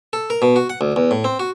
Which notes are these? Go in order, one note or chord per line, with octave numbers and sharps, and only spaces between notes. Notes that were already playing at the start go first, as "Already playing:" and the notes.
A4
A#4
B2
F#4
F#5
D2
E2
A2
C4
F#4